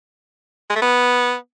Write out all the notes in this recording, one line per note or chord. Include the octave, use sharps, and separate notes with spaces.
G#3
A3
B3